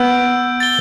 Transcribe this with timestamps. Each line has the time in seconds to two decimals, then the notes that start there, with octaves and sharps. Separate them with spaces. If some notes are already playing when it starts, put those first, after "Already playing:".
Already playing: B3 E6 G6 D7
0.60 A6 G7